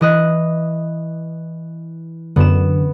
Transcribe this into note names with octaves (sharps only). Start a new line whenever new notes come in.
E3 D#5 F#6
F#2 D3 B3 E7